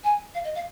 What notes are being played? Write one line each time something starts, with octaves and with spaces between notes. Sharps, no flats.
G#5
F5
D#5
F5